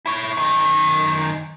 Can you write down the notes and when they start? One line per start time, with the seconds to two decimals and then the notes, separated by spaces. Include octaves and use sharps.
0.06 E4 C#5
0.37 F#2 D#3